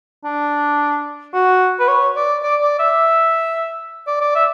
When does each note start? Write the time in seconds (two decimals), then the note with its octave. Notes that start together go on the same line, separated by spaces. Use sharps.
0.24 D4
1.34 F#4
1.80 B4
1.88 C#5
2.16 D5
2.43 D5
2.62 D5
2.79 E5
4.07 D5
4.21 D5
4.35 E5